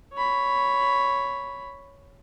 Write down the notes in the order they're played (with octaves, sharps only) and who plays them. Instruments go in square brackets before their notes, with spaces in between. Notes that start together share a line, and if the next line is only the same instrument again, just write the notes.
[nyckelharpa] C#5 B5